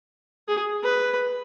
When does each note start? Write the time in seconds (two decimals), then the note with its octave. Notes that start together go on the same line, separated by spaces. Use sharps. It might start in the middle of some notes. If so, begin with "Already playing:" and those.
0.48 G#4
0.84 B4